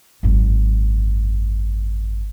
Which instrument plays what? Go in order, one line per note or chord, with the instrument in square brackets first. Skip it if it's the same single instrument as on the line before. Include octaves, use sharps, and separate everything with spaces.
[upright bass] G#1 F#2